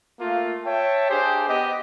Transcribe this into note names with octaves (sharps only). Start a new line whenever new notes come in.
A3 A#3 F4
C#5 E5 G5 A5
D4 G4 G#4 C5
B3 G4 D#5